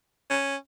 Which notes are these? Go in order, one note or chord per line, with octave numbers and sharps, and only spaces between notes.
C#4